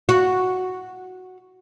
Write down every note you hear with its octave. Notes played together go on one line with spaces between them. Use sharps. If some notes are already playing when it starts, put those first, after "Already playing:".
F#4